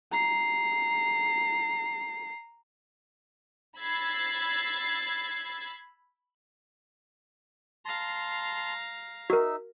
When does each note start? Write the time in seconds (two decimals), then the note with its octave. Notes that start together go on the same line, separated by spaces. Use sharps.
0.12 A#5 C7
3.78 B5 E6 G#6 A6 C7
7.86 F5 A5 A#5 C6
9.30 D#4 F#4 A#4 E5